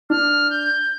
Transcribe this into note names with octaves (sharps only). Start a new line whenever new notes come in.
D4 F6
G6